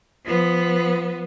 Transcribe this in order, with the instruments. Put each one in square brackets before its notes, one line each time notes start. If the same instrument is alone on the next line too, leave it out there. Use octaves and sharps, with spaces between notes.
[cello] F3 B3